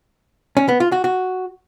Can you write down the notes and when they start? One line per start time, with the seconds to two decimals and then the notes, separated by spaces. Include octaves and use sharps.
0.57 C#4
0.68 B3
0.80 F4
0.92 F#4
1.04 F#4